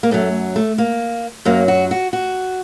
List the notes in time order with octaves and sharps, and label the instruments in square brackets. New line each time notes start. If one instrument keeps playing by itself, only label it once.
[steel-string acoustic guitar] A#3
F#2 F#3 A3
A3
A#3
F#2 F#3 A#3
F#4
F#4
F#4